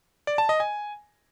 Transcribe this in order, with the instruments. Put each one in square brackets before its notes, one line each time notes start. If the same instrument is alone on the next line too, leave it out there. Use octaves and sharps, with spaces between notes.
[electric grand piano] D5
A5
D#5
G#5